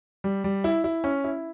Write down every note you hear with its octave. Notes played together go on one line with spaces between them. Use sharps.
G3
G3
E4
E4
C#4
E4